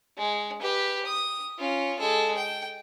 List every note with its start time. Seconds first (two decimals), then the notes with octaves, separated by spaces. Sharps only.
0.18 G#3
0.61 G4 B4
1.05 D#6
1.59 C#4 F4
1.99 G#3 A4
2.37 G5